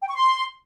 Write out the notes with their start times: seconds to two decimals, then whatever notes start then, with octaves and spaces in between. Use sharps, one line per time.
0.01 G5
0.08 C#6
0.15 C6